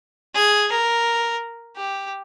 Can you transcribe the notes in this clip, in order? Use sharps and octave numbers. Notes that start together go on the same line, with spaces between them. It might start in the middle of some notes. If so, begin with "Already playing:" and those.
G#4
A#4
G4